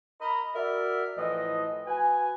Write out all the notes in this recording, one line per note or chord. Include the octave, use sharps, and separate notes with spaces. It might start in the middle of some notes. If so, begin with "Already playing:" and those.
A#4 D#5 A#5 B5
F#4 A#4 D5 E5
A2 E3 F3 D#5
F#4 B4 G#5